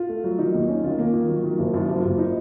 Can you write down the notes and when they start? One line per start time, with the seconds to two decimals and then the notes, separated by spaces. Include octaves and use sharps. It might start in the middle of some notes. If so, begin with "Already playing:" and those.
Already playing: F4
0.09 A3
0.24 F#3
0.38 D#3 D#4
0.54 D#2
0.68 C#4
0.84 D#3 F4
0.99 A#3
1.13 D#3
1.29 F#3
1.44 D#3
1.58 F#1
1.73 F#2 F4
1.89 F#1
2.03 F#1
2.18 D#4